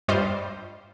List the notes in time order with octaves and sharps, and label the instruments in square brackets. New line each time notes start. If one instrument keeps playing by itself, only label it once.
[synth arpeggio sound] G2 G3 F4 C5 D#5